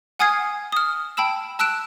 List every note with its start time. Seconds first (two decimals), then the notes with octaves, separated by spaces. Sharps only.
0.19 F#5 G#5 D#6 F6 G#6 C7
0.72 D#6 F6
1.17 G5 A5 B5 E6 E7
1.59 A5 E6 F#6 D7 E7